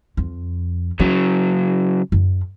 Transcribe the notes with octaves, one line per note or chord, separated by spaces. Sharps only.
F2
C#3 F#3 C#4
F#2